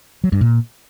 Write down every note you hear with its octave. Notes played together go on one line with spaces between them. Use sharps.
F#3
G2
A#2